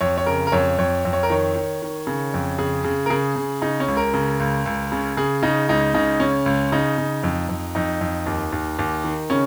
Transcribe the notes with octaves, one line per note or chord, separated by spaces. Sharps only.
F2 C#5
C#5
C#3 A#4
A#4
F2 C#5
F2 C#5
F2
C#5
A#4
D#3 C#5
D#3
D#3
C#3
F2
C#3 G#4
C#3
A#4
C#3 G#4
C#3
C#3 D#4
C#4
C#2
A#4
C#3
C#2
C#2
C#3
C#3 G#4
C#3 D#4
C#2 D#4
C#3 D#4
C#3 C#4
C#2
C#3 D#4
C#3
F2
F2
F2 D#4
F2
D#2
D#2
D#2
D#3
C#3 C#4